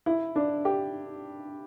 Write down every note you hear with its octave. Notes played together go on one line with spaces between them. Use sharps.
E4
D4
G4